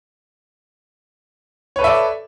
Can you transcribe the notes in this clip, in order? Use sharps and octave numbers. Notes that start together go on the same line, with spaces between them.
A4 B4 C#5 D5 E5